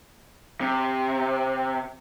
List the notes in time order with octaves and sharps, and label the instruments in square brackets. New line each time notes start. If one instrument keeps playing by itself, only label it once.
[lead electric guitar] C3